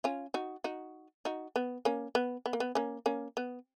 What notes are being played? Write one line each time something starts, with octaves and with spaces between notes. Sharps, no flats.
C#4 F4
D#4 F#4
D#4 F#4
D#4 F#4
B3
A#3 C#4
B3
B3
A#3
B3
A#3 C#4
A#3 C#4
B3